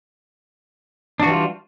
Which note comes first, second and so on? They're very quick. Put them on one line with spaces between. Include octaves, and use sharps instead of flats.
D4 F#4 E3 G3 F4